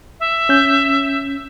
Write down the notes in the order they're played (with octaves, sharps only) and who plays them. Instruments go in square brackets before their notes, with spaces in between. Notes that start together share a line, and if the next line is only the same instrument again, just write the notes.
[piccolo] E5
[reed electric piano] C#4 G6